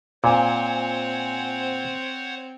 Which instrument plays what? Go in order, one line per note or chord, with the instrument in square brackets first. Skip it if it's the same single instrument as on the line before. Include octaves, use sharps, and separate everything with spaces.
[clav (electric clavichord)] A#2 [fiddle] C4 [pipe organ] C5 C#5 F#5 [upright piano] G#5